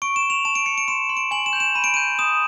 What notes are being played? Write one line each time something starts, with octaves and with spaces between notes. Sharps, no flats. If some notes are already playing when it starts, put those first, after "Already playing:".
C#6 D7
E7
C#6
F7
A5 E7
D7
A5 C#7
D7
C6 E7
C6
D7
G#5 F#7
E7
G6 F7
E7
B5 D#7
D7
D#7
G6
D#6 E7